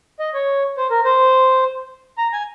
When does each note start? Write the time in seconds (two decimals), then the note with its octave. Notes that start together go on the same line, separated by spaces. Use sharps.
0.20 D#5
0.34 C#5
0.77 C5
0.90 A#4
1.05 C5
2.18 A#5
2.33 G#5